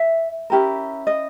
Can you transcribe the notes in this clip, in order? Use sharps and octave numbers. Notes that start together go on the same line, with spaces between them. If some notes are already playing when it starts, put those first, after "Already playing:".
Already playing: E5
C#4 E4 G4 A#4
D#5